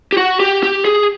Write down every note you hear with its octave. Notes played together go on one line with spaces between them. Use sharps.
G4
F#4
G4
G4
G#4